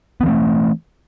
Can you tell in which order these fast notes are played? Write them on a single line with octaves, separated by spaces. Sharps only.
B3 E3 C4 A3